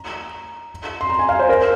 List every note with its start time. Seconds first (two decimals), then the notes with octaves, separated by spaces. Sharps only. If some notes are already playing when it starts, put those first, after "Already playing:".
Already playing: A#5
1.01 C6
1.09 A#5
1.19 G#5
1.29 F5
1.39 C5
1.49 A#4